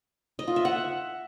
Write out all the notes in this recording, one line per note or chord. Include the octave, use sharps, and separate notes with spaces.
D#5
F4
E5
F#5